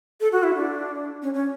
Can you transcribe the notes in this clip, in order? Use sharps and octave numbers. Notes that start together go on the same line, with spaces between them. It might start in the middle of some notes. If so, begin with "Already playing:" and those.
A4
F#4
E4
D4
C#4
C#4